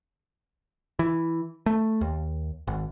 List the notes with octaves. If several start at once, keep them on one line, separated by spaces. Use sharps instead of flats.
E3
A3
D#2
G#1